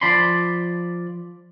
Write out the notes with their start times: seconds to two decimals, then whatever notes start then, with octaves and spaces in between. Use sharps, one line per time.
0.01 F3 D5 A5 B5 C6